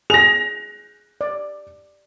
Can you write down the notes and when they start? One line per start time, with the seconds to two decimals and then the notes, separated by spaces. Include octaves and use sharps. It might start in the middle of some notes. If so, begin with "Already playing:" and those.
0.10 G#4 A#6 F7
1.21 D5